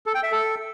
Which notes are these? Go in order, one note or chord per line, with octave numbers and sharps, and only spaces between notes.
A4
G5
E5
A4